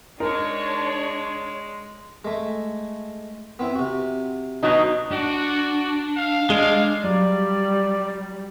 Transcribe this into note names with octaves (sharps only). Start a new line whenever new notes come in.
G#3 D4 D#4 A#4 C#5
G#3 A3
B3 C4 E4
C3 F#4
B2 F#3 D#4 A5
D4 F#4
F5
G#3 D4
F#3 G3 F4 D5